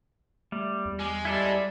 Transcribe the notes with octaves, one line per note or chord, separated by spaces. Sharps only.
G3 A3
E2
G#3
G3 E4 A4 D5